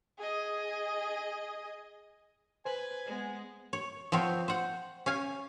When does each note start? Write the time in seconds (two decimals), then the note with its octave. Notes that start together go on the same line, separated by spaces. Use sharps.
0.18 G#4 D#5
2.65 B4 C5 G#5
3.06 G#3 B3
3.73 C#5
4.12 F3 B3 C4 C#5
4.48 C5 F#5
5.06 C#4 F5 G#5